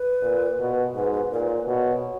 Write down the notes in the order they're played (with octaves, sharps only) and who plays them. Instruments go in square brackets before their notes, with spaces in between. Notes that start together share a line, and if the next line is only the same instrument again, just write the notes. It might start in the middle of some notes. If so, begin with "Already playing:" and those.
Already playing: [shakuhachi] B4
[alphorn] A#2
B2
[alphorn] G#2 [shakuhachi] B4
[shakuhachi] B4
[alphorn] A#2 [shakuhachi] A#4
[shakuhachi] B4
C#5
B4
[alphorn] B2 [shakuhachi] C#5